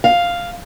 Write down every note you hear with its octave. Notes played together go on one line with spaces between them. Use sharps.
F5